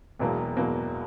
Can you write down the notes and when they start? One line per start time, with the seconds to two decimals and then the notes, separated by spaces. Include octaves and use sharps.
0.19 E1 E2 B2 F#3 A#3
0.57 E1 E2 B2 F#3 A#3